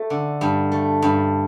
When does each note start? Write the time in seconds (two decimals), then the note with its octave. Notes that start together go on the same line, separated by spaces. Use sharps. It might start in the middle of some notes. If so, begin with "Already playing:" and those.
Already playing: A3
0.10 D3
0.41 G2
0.72 A3
1.02 G2